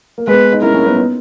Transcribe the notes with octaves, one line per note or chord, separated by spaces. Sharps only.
A#3
G#3 B3 B4
D#4
C#4 E4 A#4
A#3 C#4
B3 D#4
B3 D#4